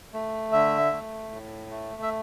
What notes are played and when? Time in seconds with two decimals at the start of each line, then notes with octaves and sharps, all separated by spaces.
0.13 A3
0.52 D3 E5
0.92 A3
1.31 A2
1.71 A3
2.02 E5